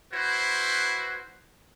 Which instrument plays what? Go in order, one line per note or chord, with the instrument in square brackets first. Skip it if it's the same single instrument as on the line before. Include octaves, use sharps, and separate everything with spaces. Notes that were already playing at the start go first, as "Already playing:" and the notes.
[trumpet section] E4 F#4 B4 C5